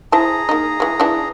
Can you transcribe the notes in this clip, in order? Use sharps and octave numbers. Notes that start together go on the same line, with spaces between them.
E4 G#4 C5 A5 A#5
A#3 D#4
E3 G#3
E3 D4